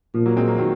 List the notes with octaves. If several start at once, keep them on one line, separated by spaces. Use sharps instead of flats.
A#2 F3
F#3 A#3
G#3 C4
F#3 A#3
D#3 F#3